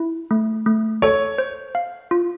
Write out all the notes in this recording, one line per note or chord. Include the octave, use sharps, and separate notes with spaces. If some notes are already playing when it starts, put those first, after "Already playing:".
Already playing: E4
A3
A3
A4 C#5
C5
F5
F4